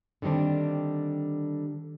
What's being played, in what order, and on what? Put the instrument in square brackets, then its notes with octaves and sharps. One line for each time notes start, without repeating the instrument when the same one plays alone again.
[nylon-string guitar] D3 D#3 G3 C4 D4